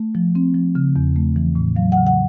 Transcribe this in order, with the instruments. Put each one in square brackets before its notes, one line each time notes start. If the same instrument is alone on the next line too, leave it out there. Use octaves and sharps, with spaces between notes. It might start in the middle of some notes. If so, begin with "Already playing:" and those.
Already playing: [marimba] A3
F3
C4
F3
C#3
E2
A3
E3
A2
F#3 F5
F#5
C#3
F#5